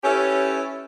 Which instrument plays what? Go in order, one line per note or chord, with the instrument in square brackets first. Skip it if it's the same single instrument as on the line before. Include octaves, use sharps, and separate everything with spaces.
[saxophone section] C#4 E4 G4 A4 B4 C#5